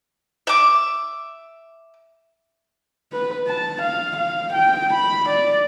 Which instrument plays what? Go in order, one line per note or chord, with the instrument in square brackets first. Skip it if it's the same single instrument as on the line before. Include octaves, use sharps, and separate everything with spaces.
[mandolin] E5 D6
[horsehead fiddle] B4
A5
F5
F5
G5
B5
D5